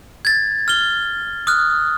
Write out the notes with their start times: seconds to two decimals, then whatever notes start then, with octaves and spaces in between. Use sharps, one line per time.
0.25 G#6 A6
0.68 F6 G7
1.47 D#6 F6 F#6